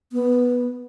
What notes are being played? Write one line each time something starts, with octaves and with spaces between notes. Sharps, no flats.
B3